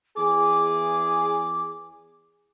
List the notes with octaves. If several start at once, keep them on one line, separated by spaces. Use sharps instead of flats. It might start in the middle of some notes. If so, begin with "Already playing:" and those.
E2 G#4 D6